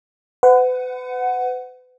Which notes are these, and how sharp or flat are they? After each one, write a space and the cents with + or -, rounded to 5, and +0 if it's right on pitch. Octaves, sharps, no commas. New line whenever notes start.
B4 +40 F#5 +0